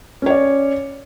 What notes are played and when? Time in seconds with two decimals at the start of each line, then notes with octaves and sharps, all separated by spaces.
0.22 C#4
0.26 C#5
0.30 D5